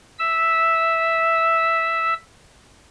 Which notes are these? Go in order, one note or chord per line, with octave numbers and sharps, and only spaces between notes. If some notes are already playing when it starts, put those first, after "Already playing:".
E5 E6